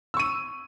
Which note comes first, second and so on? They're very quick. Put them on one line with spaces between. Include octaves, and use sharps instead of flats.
E6 C#6 D#7